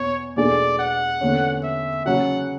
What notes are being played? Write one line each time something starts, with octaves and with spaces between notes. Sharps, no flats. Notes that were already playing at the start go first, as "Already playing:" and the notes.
Already playing: E2 B2 C#5
E2 B2 A3 D4 G#4 D5
F#5
E2 D3 A3 C#4
E5
C#3 F#3 C#4 F#4 F#5